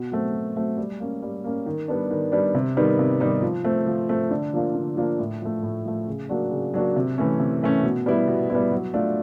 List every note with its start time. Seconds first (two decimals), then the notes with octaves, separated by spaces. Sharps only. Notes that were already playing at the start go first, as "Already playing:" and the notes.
Already playing: B2
0.12 F#3 A3 C4
0.33 B2
0.56 F#3 A3 C4
0.77 G3
1.00 A#3 C#4
1.22 G3
1.44 A#3 C#4
1.66 D#3
1.88 G3 B3 D4
2.11 D#3
2.32 G3 B3 D4
2.55 C3
2.77 D#3 G3 B3 D#4
2.99 C3
3.20 D#3 G3 B3 D#4
3.42 F3
3.64 A3 C4
3.87 F3
4.09 A3 C4
4.31 D3
4.53 F3 A#3 D4 F4
4.75 D3
4.97 F3 A#3 D4 F4
5.19 A2
5.42 F3 A3
5.63 A2
5.85 F3 A3
6.08 C#3
6.29 F#3 A#3 D4 F#4
6.51 C#3
6.74 F#3 A#3 D4 F#4
6.96 C3
7.18 E3 A3 C#4
7.39 C3
7.62 E3 A3 C#4
7.83 B2
8.06 G3 B3 E4
8.28 B2
8.50 G3 B3 E4
8.72 F#3
8.94 A3 D4 F4